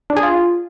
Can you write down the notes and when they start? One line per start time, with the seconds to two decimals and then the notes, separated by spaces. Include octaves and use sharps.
0.10 D4
0.17 G#4
0.23 F4